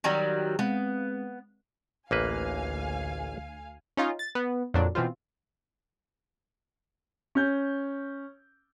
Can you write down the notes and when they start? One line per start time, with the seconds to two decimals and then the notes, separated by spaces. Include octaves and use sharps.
0.04 D#3 F#3 G3
0.59 G#3 B3 C4 F5
2.11 A1 D2 A#3 B4 F5 G#5
3.97 C#4 D#4 F4
4.19 A6
4.35 B3
4.74 F2 A#2 F#3 D4
4.95 B2 E3 C4 F4
7.35 C#4 G6